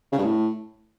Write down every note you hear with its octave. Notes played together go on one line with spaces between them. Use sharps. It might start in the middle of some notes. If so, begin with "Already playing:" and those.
C#3
G2
A2